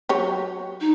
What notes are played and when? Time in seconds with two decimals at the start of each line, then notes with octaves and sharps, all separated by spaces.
0.09 F#3 G4 C#5
0.80 D#4